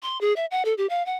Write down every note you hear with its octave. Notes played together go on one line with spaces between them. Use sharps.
C6
G#4
E5
F#5
A4
G4
F5
F#5